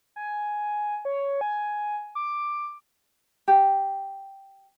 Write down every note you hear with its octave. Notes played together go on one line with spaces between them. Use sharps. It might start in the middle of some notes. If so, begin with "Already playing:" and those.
G#5
C#5
G#5
D6
G4